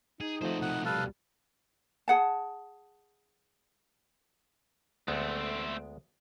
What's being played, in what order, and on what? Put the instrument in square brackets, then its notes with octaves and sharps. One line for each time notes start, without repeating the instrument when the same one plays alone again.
[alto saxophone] D#4 [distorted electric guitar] G#4
[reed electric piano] F3 A3 C4 [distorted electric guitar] F#4 C5
[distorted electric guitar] C2 B2 [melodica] F#5
[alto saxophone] G3 [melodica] A4 B4 F5
[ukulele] G#4 F#5 A5
[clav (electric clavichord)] D2 G#3 B3 [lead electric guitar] A3 C4